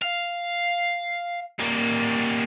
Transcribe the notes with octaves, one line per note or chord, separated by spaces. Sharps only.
F5
G3 A#3